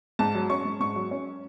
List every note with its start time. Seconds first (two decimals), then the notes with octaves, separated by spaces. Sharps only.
0.19 G#2 A5
0.35 F#3
0.50 C#4 C#6
0.65 G#2
0.80 G#2 C#6
0.96 F#3
1.11 C#4